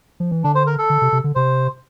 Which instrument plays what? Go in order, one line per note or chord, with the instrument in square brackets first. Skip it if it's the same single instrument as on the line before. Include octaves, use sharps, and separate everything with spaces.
[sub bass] F3
E3
[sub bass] D3 [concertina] D4
[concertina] C5
A#4
A4
[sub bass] D3
C3
C3
D3
[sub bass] C3 [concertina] C5